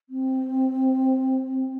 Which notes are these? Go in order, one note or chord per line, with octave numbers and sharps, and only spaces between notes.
C4